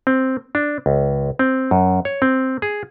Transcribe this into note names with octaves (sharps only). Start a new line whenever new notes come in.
C4
D4
C#2
C4
F#2
C#5
C4
G#4